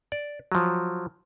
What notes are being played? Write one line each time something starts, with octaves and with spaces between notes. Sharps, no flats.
D5
F3 F#3